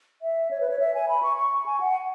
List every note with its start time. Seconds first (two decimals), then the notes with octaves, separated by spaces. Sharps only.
0.22 E5
0.51 C#5
0.61 B4
0.70 C#5
0.79 E5
0.94 G#5
1.09 B5
1.23 C#6
1.37 C#6
1.66 G#5
1.80 F#5